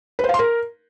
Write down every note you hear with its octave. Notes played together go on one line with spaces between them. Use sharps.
B4
C5
F5
C6
A#4